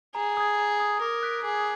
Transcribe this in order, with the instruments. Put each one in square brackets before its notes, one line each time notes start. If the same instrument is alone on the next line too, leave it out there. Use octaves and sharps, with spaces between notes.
[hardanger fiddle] G#4 [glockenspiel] A#5
[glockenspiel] D#6 G#6
A#5
D#6 G#6
[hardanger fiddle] A#4 [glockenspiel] D6
[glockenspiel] F#6 B6 D7
[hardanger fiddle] G#4 [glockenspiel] D6